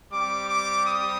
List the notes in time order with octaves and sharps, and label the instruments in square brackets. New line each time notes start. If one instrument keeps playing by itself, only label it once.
[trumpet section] G3 C4 G4 D6
D6
D#6